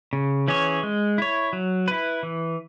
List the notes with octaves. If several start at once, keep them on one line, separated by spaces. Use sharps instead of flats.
C#3
E3 C#4 G#4 C#5
G#3
E4 C#5
F#3
E4 B4
E3